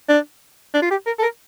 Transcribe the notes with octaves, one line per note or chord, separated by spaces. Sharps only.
D4
D4
F4
G4
A#4
A4
A#4